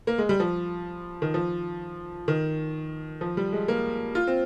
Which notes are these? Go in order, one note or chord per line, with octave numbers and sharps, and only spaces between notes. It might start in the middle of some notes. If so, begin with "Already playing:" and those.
A#3
G#3
G3
F3
D#3
F3
D#3
F3
G3
G#3
A#3
F4
C4